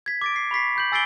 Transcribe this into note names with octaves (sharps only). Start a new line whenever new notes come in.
G#6 B6
D6 A6 D7
C7
B5 C#6 B6 C7
B5 G6 F#7
G#5 E6 A6 C7 D7 G7